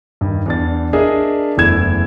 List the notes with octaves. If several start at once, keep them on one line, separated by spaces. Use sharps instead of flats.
G2 D#3
E2 D4 A6
D4 G#4 A#4 D#5 E5
F#1 E2 A3 E4 G#6 E7